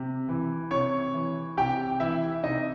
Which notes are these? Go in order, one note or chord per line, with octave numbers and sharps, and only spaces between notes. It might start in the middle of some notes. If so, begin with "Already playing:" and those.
Already playing: C3
E3
C3 C#5 C#6
E3
C3 G4 G5
E3 E4 E5
C3 D#4 D#5